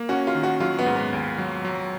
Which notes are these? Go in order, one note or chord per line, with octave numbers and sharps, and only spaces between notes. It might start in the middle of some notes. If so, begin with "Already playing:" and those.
Already playing: A#3
C#4 F#4
F4
D#3
F#4
F#3 F4
B3
G#2
B3
D#2
F#3
F#3